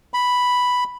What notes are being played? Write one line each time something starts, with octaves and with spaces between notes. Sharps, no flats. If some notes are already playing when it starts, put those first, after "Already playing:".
B5